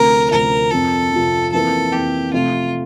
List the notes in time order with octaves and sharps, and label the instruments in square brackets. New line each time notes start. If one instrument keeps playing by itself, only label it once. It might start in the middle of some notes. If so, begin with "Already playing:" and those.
Already playing: [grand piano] D2 C3 F3 A3 C4 [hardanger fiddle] A#4
[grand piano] D2 C3 F3 A3 C4 [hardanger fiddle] A#4
[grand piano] F2 C3 F3 [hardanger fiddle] A4
[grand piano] F2 C3 F3
[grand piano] F2 E3 A#3 [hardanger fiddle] A4
[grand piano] F2 E3 A#3 [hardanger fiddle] G4
[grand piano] C3 F3 A3 [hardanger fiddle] F4